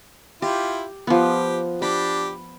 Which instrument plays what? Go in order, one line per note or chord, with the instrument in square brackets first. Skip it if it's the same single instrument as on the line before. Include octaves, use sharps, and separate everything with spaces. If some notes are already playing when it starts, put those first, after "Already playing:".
[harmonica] E4 F4 [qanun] G4
[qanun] F3 B3 [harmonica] G4
[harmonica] D4 G4 [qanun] B5